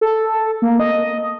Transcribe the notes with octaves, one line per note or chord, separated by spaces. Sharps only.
A4
A#3
D#5